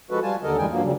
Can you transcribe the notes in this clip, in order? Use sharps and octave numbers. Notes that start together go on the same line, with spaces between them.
F3 G#3 F#4 A4 B4
G3 F4 G#5 A5
D#2 D3 A4 A#4 D#5
F#2 E3 G3 G#3 G5 G#5
G2 F3 F#3 A#3
C#3 F#3 G3